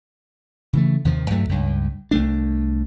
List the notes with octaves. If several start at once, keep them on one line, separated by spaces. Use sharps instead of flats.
C#3 E3 A3
D#2 C3 D#3 F3
G2 F#3 A3
C#2 G2
C2 A3 D4